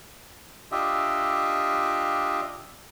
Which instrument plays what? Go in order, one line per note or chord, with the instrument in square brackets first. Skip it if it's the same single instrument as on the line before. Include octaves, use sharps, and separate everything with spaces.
[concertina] D4 F4 G4 D#5 E5